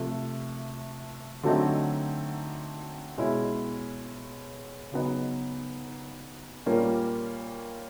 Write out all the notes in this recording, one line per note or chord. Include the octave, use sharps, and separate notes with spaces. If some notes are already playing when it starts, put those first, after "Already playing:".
Already playing: C3 F3 A3
D3 F#3 A3 C4 D#4
B2 G#3 C#4 E4
C#3 F#3 B3 D#4
A#2 G3 A#3 C#4